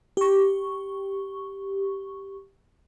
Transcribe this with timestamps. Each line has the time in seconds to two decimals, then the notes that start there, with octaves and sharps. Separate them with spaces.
0.17 G4 C#6